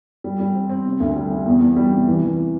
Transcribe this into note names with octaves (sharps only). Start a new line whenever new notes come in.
G3
G3
C4
C4
C3
D2
G3
G3
E2
E2
G3
C3
E3
E3